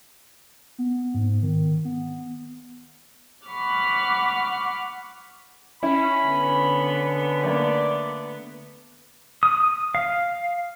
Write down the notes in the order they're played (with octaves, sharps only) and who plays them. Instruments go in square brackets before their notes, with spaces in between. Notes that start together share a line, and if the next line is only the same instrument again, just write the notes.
[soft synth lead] B3
G#2
D#3
B3
[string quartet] F#5 B5 C#6 D6 F6 F#6
[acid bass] C#4 [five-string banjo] E4 [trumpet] B5
[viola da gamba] D3 B3
[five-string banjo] G3 A3 A#3 [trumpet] D5
[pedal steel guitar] D#6
F5